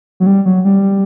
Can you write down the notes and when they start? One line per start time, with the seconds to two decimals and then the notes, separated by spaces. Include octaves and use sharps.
0.20 F#3
0.26 G3
0.45 F#3
0.65 G3